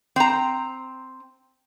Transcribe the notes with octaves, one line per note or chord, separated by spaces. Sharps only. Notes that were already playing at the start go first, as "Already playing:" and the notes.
C4 A#5